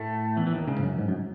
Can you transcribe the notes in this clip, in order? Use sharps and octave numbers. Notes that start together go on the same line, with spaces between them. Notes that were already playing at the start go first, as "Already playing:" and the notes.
Already playing: A2 A3
E2 E3
E3
D#2 D#3
C#2 C#3
G#2
F#2
G#2
F#2